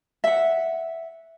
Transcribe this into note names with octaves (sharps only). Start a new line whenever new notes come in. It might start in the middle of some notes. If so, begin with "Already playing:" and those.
E5 F#5